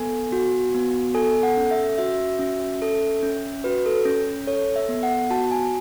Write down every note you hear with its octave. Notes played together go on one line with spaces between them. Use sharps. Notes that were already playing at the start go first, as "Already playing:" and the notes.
Already playing: B3 A4 G#5
F#4
B3
A4 G#5
F#5
C#4
E5
F#4 E5
C#4
A4
C#4
F#4 B4
A4
C#4
A4 C#5
E5
B3
F#5
F#4 A5
G#5